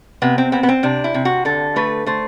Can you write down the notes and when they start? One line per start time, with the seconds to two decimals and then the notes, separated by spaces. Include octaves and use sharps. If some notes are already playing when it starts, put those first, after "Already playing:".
0.22 C3 B3
0.38 C4
0.52 B3 C4
0.63 B3
0.69 C4
0.83 C3 D4
1.04 E4
1.14 C3
1.25 F#4
1.45 D3 A4
1.76 A3 B4
2.06 A3 C5